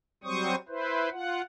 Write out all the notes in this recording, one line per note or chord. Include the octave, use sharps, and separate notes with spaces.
F#3 G3 C4 C5 C#6 D#6
E4 B4 C5
F4 F#5